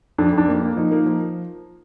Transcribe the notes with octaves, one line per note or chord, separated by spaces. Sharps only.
F2 D4
F2
D4
A#3
A#3
F3 D#4
A#3
F3